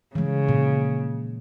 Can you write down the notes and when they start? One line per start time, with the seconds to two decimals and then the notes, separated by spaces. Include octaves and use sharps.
0.15 C#3 E3 G#3
0.49 A#2